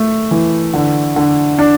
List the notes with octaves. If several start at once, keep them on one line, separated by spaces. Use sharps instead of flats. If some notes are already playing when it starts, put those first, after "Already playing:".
Already playing: A3
E3
D3
D3
D4